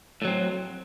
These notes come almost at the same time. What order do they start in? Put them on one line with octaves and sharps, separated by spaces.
A2 F#3 C4